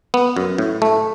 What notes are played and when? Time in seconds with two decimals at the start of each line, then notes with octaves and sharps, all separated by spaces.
0.14 B3
0.37 F#2
0.58 A2
0.82 A3